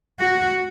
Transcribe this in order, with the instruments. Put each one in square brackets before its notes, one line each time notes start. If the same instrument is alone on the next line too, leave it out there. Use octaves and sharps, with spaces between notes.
[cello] F#4